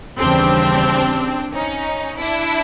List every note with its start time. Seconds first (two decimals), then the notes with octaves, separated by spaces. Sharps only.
0.19 D#2 C#3 E3 G3 C4 D4
1.52 C#4 D#4
2.18 D4 E4